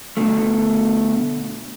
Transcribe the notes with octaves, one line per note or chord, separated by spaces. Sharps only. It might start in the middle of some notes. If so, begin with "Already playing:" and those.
B2 D3 A3